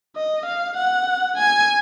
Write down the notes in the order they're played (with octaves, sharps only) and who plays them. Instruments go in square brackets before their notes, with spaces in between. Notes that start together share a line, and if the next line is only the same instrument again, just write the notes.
[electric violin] D#5
F5
F#5
G#5